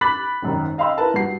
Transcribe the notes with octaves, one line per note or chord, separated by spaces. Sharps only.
B5 D6 F#6 A6 B6 F#7
G#1 F#2 D#3
D#5 F5 G5 B5 C6 E6
E4 A#4 B4 A5 B5
G2 G3 F#4 C7